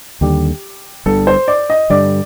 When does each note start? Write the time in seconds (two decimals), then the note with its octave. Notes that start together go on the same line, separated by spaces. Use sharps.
0.21 D#2 D3 G3 G4
1.06 G1 G2 D3 A4
1.27 C5
1.48 D5
1.70 D#5
1.90 G2 D3 G3 D5